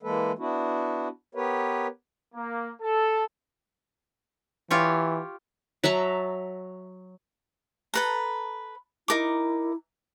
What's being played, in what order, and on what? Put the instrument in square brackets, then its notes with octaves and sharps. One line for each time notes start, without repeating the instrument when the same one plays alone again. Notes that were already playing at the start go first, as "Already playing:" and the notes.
[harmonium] E3 G#3 A#3 A4 B4
B3 D4 E4 F#4
B3 G4 A#4 B4 C#5
[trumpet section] A#3
A4
[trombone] E3 [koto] F4 G4 C#5
[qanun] F#3 E5 A5 A#5
[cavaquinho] A4 B4 A#5
[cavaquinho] D#4 A#4 D6 [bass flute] E4